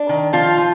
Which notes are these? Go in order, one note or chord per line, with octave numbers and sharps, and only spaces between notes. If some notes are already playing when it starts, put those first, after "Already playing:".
Already playing: D4
D#3
F3 F4
F3